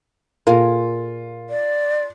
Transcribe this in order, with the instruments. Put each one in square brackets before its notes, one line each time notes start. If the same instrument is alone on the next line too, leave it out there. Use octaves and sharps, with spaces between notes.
[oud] A#2 G#4 A#4 [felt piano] F4
[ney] D5